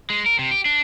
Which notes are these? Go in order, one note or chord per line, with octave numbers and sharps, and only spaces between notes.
G#3
A#4
C3
G4
D4